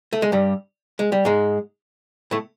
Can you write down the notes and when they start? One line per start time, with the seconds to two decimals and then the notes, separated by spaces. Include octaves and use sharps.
0.13 A3
0.22 G#3
0.32 G2 G3
0.99 G#3
1.12 G3
1.25 G#2 G#3
2.31 A2 A3